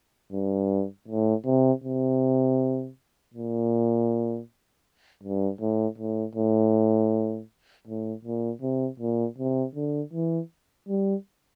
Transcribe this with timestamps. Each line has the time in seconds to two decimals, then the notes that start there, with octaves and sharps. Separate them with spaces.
0.32 G2
1.08 A2
1.46 C3
1.84 C3
3.34 A#2
5.23 G2
5.61 A2
5.98 A2
6.35 A2
7.87 A2
8.25 A#2
8.62 C3
9.00 A#2
9.38 C3
9.75 D3
10.13 E3
10.88 G3